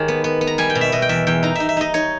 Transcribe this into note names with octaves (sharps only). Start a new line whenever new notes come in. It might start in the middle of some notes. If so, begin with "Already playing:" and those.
Already playing: D#3 G#3 G4 C#5
B3
B3
B3
A#5
G3 G#5
G5
B2
E5
B2 D#5
G5
E2 E5
E2 G5
D#4 A#5
D#4 E5
E5
D#4 D#5
D#4 C#5